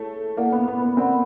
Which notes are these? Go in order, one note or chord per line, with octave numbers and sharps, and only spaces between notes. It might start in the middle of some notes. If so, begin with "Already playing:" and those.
Already playing: A3 E4 G#4 C#5
A#3 E4 A4 D5 F#5
B3
B3
B3
C4 A#4 D5 F#5 B5